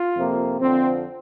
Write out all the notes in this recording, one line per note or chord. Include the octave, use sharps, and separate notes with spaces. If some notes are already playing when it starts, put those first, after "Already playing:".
Already playing: F4
F2 C3 A#3
F2 D3 F3 C4